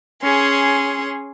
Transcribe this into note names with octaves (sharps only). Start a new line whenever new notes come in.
C#4 G#4 C6